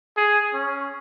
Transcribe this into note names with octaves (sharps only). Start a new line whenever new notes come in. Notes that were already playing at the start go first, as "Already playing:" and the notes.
G#4
C#4